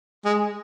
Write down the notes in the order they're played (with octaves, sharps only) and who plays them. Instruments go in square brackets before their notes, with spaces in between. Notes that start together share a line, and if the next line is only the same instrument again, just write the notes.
[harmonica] G#3